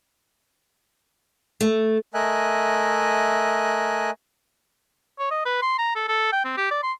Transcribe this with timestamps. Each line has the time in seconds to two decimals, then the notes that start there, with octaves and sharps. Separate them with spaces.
1.61 A3
2.14 A3 A#4 D#5 E5 G#5 F#6
5.19 C#5
5.31 D#5
5.46 B4
5.62 C6
5.78 A#5
5.95 A4
6.08 A4
6.33 G5
6.45 C4
6.57 G4
6.71 D5
6.83 C6